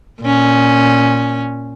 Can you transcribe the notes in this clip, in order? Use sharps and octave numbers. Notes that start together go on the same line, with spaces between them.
A#2 C#4